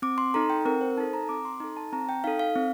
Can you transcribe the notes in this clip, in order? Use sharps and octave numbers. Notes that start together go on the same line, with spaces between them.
C4 D6
C6
D#4 A4 A#5
G5
C4 A#4
C5
D#4 A4 A5
A#5
C4 D6
C6
D#4 A4 A#5
A5
C4 A#5
G5
D#4 A4 F5
F5
C4